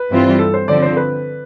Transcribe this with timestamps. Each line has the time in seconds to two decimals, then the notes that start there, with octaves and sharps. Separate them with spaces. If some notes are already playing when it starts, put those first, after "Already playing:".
Already playing: B4
0.10 G2 E3 G3 C4 F4
0.39 A4
0.54 C5
0.68 D3 F3 C4 D5
0.82 C5
0.97 B4